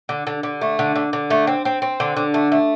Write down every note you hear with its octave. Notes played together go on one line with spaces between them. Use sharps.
D3
D3
D3
A3
D3
D3
D3
A3
C4
C4
C4
D3
D3
A3
A3